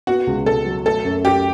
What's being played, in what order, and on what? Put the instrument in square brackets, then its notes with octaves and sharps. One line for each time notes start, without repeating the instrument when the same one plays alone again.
[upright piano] B3 [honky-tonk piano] F#4
[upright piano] C#2
[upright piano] B2 [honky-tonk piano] A4
[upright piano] F#3
[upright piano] A3 [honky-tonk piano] A4
[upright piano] F#2
[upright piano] F#2 [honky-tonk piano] G4